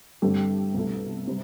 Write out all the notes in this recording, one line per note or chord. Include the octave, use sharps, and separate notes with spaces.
G2 D3 A3 C4 G4
C2 B2 A3
C3 G3